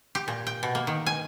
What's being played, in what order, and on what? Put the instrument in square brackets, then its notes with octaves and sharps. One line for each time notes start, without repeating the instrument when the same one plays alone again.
[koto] G4
A#2
G5
B2
A#3
D#3
G#5